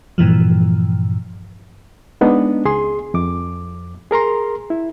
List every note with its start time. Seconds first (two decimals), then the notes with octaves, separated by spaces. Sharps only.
0.18 G2 A#2 E3 F3
2.21 G#3 B3 D4 D#4
2.65 C#2 G#4 C6
3.14 F2 D6
4.11 G#4 A#4 A#5 C6
4.70 E4